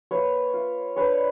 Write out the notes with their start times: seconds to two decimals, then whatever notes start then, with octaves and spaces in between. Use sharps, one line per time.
0.11 A#3 B4 C#5
0.53 F4
0.96 D4 B4 C#5